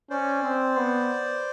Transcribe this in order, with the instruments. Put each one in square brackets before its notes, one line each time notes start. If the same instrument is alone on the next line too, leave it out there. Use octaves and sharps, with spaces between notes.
[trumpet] C#4 [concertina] C5 D5
[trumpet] C4
B3